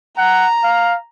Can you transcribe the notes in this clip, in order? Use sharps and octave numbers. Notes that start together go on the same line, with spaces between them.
F#5 A#5
F5